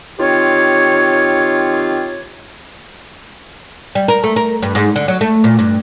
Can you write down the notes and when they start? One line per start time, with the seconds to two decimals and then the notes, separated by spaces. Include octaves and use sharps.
0.19 D#3 C4 F4 G4 C#5
3.95 G3
4.08 A#4
4.24 A3
4.36 A#4
4.62 G2
4.75 G#2
4.96 D3
5.08 F#3
5.21 A3
5.44 A#2
5.59 G2